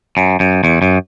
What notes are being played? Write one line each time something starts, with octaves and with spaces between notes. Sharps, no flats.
F#2
F#2
E2
F#2